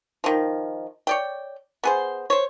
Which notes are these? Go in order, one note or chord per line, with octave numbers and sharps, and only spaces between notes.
D#3 F3
C#5 D5 G5
B3 G#4 C5
C5 C#5